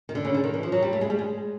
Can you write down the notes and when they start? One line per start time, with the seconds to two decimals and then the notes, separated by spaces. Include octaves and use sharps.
0.09 D#3
0.15 D3
0.25 C#3
0.34 D3
0.44 D#3
0.54 E3
0.63 F3
0.72 F#3
0.82 G3
0.93 A3
1.01 G#3
1.10 G3
1.19 G#3